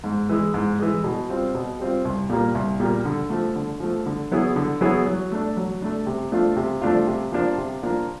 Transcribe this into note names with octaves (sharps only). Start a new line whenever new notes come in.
G#2
E3 G#3
G#2
E3 G#3
B2
G3 C4 F4
B2
G3 C4 F4
C2
A#2 G3 A#3
C2
A#2 G3 A#3
D3
F3 A3
D3
F3 A3
D3
F#3 B3 E4 G#4
D3
F#3 B3 E4 G#4
F#3
A3 D4
F#3
A3 D4
C3
F3 A3 D4 F4
C3
F3 A3 D4 F4
C3
F3 A#3 D4 F4
C3
F3 A#3 D4 F4